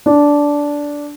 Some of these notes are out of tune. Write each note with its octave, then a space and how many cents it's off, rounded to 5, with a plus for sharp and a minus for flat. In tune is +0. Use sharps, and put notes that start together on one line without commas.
D4 -10